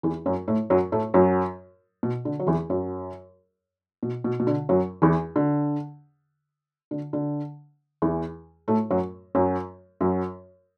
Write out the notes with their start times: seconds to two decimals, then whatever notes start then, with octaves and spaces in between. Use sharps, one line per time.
0.03 E2 E3
0.26 F#2 F#3
0.48 A2 A3
0.70 F#2 F#3
0.92 A2 A3
1.14 F#2 F#3
2.03 B2
2.25 D3
2.39 F#3
2.47 E2 E3
2.70 F#2 F#3
4.03 B2
4.24 B2
4.40 B2
4.47 D3
4.69 F#2 F#3
5.02 E2 E3
5.36 D3
6.91 D3
7.13 D3
8.02 E2 E3
8.68 A2 A3
8.91 F#2 F#3
9.35 F#2 F#3
10.01 F#2 F#3